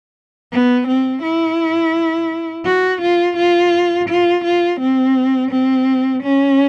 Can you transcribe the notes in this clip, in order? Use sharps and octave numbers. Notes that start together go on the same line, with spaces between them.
B3
C4
E4
F#4
F4
F4
F4
F4
C4
C4
C#4